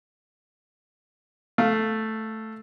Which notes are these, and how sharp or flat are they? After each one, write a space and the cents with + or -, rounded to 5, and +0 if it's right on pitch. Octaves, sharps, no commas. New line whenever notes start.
A3 +0 F5 +0